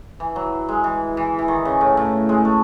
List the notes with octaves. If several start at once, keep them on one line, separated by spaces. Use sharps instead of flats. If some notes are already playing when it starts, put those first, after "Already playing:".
E3
F#3
G#3
E3
E3
E3
D#3
C#3
A2
A2
G#3
A3